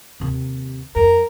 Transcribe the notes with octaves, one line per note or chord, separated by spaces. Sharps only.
D#2 C3
F2 A#4